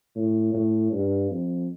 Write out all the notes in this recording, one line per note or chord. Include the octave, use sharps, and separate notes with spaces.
A2
A2
G2
F2